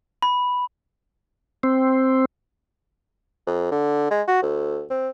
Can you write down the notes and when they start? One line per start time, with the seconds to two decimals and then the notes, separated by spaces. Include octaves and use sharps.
0.22 B5
1.63 C4
3.47 F2
3.71 D3
4.11 G#3
4.28 F#4
4.42 D2
4.90 C4